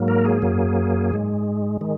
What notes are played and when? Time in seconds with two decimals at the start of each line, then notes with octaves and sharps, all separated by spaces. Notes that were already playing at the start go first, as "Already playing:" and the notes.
Already playing: G#2 F#3 A#3
0.08 A#4
0.25 G#4
0.42 F#2 F#3 A#3
1.12 G#2 G#3
1.81 D#3 G#3